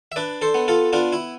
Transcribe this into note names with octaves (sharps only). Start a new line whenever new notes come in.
E5
D4 B4 D5
A4 C5
B3
F4 A4
B3 D4 F4
E4